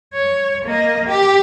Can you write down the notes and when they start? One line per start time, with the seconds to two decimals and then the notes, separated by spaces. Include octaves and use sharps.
0.13 C#5
0.65 A#3 D#5
1.07 G4